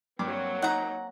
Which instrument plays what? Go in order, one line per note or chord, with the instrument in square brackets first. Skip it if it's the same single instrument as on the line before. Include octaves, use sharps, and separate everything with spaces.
[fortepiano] G2 D6 [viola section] F#3 A#3 C4
[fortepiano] D#4 [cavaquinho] F#5 A#5